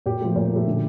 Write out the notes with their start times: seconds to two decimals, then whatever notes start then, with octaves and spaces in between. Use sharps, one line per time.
0.06 A#2 G4
0.21 F3 A3
0.36 A#2
0.51 F3 A3
0.66 D3